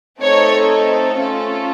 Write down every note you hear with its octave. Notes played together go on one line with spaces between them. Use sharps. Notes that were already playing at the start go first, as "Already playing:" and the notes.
A3 C4 D#4 A4 C#5
A3 C#4 F4 A4